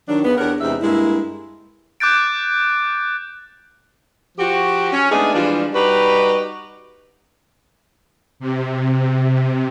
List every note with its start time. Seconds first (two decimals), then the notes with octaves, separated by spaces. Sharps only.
0.09 D#3 F#3 D4
0.25 C#3 B3
0.38 E2 D4 G4 A#4 C#5 F#5
0.61 E2 C3 G#3 D4 D#4 E5
0.82 G2 G#3 A#3 E4
2.00 D6 F#6 G6 A6 D7
4.38 F3 F#4 G4
4.92 C#4
5.10 G#3 A3 B3 D4 D#4 G#4
5.34 E3 F3 G3 G#3 D4 F4
5.73 G3 D#4 F#4 G4 B4
8.40 C3